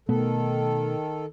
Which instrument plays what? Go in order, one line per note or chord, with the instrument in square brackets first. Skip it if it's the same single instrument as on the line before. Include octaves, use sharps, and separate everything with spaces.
[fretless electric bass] B2 A3 B3 [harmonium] D#3 A4